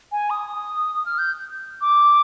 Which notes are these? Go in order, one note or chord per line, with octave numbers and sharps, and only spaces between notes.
G#5
D#6
F6
G6
D6